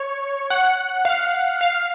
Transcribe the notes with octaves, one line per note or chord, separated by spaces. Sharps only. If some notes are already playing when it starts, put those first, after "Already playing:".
Already playing: C#5
F#5
F5
F5